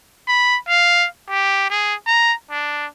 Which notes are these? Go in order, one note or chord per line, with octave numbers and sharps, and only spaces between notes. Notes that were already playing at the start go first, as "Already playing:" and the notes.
B5
F5
G4
G#4
A#5
D4